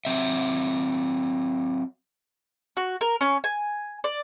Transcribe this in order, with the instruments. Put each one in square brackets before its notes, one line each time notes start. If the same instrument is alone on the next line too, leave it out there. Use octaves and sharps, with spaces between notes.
[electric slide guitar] F#3 C4 E5
[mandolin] F#4
A#4
C#4
G#5
D5